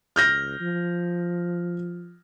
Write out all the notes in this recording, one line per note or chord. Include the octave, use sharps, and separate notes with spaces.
C#2 F6 G6 A#6
F3